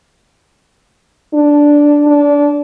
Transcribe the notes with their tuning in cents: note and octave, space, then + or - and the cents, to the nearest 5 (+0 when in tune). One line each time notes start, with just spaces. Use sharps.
D4 -5
D4 -20